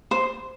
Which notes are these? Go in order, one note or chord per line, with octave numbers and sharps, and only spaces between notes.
C5